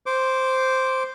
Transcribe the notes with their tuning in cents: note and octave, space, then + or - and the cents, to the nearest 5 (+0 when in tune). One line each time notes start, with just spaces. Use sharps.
C5 +0 D6 -15